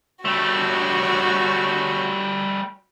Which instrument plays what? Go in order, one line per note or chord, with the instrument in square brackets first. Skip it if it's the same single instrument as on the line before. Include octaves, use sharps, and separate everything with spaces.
[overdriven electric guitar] G3 A3 [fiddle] F#4 C#5